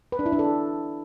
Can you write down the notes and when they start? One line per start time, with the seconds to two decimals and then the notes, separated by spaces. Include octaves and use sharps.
0.12 B4
0.19 D4
0.26 E4
0.32 D4
0.39 A4